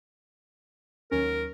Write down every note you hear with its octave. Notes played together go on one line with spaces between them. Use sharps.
D#2 F#3 C#4 A#4